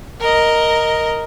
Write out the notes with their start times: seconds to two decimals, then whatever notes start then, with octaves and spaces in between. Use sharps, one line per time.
0.20 A#4 D#5